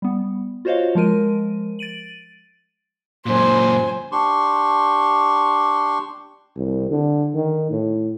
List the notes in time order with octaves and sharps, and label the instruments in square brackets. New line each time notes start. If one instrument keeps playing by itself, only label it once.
[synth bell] G3 B3
F4 F#4 C5 C#5 D#5 F5
F3 G#3 A#4 D#7
A6 D7 D#7 F#7
[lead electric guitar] F#2 A#2 [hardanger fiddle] C5 G#5
[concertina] D4 G4 C6 C#6
[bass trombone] C2
D3
D#3
A2